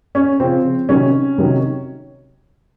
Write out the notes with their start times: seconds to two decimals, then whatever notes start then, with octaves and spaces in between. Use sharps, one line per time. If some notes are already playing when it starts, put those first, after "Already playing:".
0.15 C#4
0.40 C#3 F3 C4
0.89 C3 D#3 F#3 C#4
1.38 C3 D#3 F#3